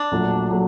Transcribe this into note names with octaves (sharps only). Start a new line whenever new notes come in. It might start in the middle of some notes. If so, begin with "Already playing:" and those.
Already playing: D4
A#1 A#2 F#3 A3
A#2 F#3 A3